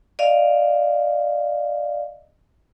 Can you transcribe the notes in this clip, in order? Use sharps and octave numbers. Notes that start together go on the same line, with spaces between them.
D5 D#5 F5